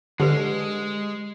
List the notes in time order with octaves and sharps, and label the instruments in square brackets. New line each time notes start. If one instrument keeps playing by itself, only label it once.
[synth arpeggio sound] D3 [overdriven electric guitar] G#3 [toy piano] G4 B4